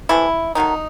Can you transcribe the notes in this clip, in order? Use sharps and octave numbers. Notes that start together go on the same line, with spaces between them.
C3 E3 A3 E4
D#3 F#3 A3 D#4